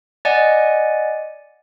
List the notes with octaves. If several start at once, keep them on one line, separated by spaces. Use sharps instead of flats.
D5 D#5 F#5 G#5